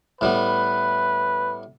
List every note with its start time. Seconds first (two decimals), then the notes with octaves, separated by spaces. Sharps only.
0.21 A2 G3 B3 B4